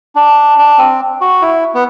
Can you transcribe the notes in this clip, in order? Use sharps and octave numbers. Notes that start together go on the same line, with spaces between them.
D4
D4
C4
F#4
E4
B3